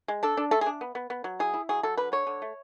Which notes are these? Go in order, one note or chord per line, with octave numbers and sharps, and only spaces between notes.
G#3
D4 A4
D4
A3 A4
G#4
D4
B3
B3
B3
F#3
E4 G#4
E4
F#3 G#4
F#3 A4
D3 B4
D3 C#5
D3
A3